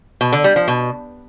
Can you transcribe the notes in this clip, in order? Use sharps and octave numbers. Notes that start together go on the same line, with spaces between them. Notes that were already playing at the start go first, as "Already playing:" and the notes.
B2
D3
G3
F3
B2